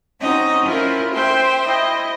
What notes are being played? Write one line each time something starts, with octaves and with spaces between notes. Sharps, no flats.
C4 C#4 D#4 F#4 D#5
C#4 E4 F4 A#4 C5
C5 E5 G5 C6
E4 D#5